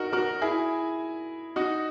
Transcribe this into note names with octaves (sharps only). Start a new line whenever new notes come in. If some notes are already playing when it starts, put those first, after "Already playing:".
Already playing: D#4 F#4 A#4
F#4 A#4
E4 G#4
D#4 F#4